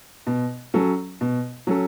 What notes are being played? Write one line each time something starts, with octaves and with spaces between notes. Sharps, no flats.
B2
F#3 C#4 A4
B2
F#3 C#4 A4